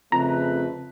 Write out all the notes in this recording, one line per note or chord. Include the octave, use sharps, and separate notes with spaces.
F2 C#3 A3 B4 A#5